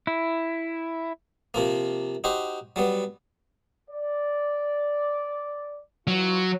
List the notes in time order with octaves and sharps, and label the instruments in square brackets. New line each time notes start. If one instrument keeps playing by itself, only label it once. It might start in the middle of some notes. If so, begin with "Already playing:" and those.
[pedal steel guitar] E4
[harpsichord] C3 F3 A#3
D#4 F#4 G4 C5
F#3 G3 B3
[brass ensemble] D5
[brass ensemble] E3 F4 [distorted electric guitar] F#3